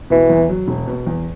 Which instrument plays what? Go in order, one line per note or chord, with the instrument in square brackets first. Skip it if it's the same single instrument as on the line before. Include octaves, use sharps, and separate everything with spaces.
[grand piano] B2 [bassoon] E3
[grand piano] E2
F#3
E1
B2
E2